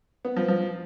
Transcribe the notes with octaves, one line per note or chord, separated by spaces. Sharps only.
B3
F3
F3